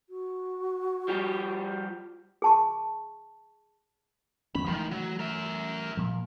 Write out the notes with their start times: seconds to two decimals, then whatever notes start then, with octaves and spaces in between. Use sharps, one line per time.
0.10 F#4
1.08 F3 G3 G4
2.42 G#4 A5 C#6
4.55 G1 E2 C#4 B5
4.67 D#3 E3 G#3 A3
4.92 F#3
5.20 A#4 E5
5.97 A#2 F3